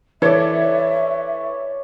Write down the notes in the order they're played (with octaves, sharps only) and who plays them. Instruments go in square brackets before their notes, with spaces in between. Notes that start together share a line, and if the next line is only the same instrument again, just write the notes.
[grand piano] E3 A4 [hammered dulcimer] C#5 D5 [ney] E5